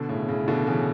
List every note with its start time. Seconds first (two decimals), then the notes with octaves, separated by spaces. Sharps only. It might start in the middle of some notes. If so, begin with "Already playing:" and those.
Already playing: B2 D3
0.09 A2 C#3
0.28 A2 C#3
0.48 B2 D3
0.67 C#3 E3